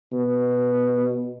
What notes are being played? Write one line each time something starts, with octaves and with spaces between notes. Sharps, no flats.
B2